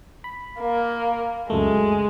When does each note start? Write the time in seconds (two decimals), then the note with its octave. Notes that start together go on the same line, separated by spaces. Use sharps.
0.24 B5
0.60 A#3
1.50 C#2 F#2 G#3 A3